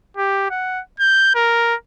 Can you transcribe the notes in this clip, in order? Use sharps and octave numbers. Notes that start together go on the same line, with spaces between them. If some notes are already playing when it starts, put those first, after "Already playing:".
G4
F#5
G6
A#4